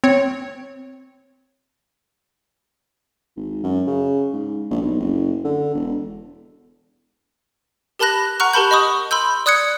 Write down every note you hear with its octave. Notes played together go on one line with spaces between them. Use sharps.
C4 C#5
G#1
F#2
C#3
G#2
A#1
B1
F#1
D3
E1
G4 A#4 A5 B5 F#6 A#6
F#5 A#5 C#6 F6 F#6
G4 A#4 A5 B5 G6
D#5 B5 C#6 D#6
B5 C6 E6 G6
D5 D#6 F#6 G#6 C#7